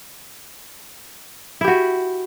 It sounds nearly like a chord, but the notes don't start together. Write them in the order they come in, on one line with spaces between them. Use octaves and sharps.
E4 G4 F#4